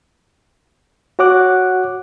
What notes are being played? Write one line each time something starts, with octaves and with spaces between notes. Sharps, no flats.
F#4 C#5 F#5 D6 F#6